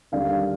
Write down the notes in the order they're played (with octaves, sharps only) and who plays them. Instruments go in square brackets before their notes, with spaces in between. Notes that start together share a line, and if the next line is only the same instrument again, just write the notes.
[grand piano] D#2 D3 G3 D5 F5